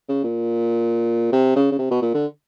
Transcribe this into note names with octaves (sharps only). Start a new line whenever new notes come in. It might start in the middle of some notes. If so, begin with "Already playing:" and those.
C#3
A#2
C3
C#3
C#3
C3
B2
A#2
D3